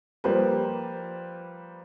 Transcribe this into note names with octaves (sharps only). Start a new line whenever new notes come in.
F3 G3 A#3 G4 B4 C5